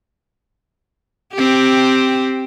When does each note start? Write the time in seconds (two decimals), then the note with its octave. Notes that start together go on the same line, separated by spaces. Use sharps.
1.34 C4 G4